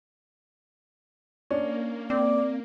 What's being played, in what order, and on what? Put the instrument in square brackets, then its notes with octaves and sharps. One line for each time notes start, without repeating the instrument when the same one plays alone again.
[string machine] A#3 [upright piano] C#4 D4
[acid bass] C4 [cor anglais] D5